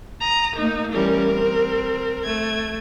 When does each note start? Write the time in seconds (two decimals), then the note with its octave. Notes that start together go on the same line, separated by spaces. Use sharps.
0.22 A#5 D#6
0.57 A3 A#3 D#4
0.94 E3 G3 C#4 A#4
1.33 C4
2.25 A3 G#6